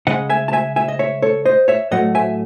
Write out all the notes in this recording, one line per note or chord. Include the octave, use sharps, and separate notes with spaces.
C#3 G#3 D#5 F#5
E5 G#5
A5
E5 G#5
E5 G#5
D#5
C#5 E5
A4 C#5
C5 D#5
C#5 E5
A2 F#3 A3 D#5 F#5
E5 G#5